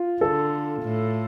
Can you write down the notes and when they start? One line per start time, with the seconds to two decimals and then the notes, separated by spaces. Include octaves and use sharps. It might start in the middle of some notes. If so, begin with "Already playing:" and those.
Already playing: F4
0.20 D3 A4
0.82 A2